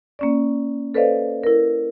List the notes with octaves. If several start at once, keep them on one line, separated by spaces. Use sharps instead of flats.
A#3 C#4 D5
A4 B4 C5 D5 D#5 F5
E4 A#4